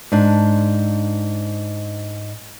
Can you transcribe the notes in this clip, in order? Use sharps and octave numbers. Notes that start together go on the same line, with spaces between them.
G#2 D4